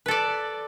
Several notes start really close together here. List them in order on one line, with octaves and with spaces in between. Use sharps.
B4 A4 D5